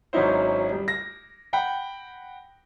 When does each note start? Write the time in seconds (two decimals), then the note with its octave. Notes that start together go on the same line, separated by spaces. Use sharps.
0.13 G#1 F#3 C#4 D#4 E4 C5
0.72 G3
0.88 A#6
1.53 F#5 G5 B5